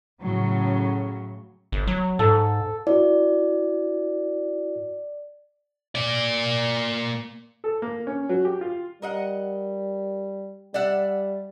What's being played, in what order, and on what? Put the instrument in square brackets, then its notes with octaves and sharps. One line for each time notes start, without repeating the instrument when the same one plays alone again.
[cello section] A2 C#3 F#3
[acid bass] G1
F#3
[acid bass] G#2 [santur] A4
[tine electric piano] E4 F#4 [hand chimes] D5
[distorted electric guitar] A#3 D5
[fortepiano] A4
A#3
C#4
F#3
G4
F4
[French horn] G3 [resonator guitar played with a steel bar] A#4 D#5 F#5
[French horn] G3 [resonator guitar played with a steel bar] D5 E5 F#5